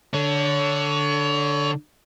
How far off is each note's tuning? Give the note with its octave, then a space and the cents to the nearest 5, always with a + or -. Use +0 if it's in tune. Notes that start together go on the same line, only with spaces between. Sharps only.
D3 +0 C#5 +25